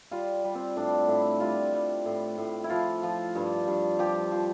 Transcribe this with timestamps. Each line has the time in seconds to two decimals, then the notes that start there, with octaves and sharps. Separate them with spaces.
0.11 G3 F4
0.44 G3
0.55 C4
0.76 A2 D4
1.08 A2 E4
1.40 G3 F4
1.73 G3
2.05 A2
2.38 A2
2.64 E4
2.70 F3 F4
3.03 F3
3.35 G2
3.68 G2
3.99 F3 G4
4.32 F3